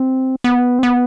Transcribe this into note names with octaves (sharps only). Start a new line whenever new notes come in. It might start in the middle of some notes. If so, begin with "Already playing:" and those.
Already playing: C4
B3
C4
B3